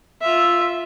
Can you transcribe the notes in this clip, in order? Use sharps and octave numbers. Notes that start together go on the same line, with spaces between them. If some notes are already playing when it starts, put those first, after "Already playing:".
F4 E5